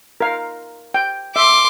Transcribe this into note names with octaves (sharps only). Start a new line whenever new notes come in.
A#4 F5
G5
E5 C6 D6